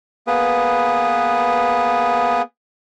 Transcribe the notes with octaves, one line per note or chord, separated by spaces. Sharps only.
A#3 B3 G#4 B4